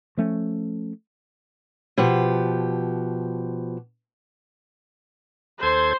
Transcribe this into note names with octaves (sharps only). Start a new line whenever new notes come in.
F3 A3 C#4
B2 F3 G4
D#2 A4 C5 G#6